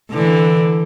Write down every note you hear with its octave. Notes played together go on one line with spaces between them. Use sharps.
D3 E3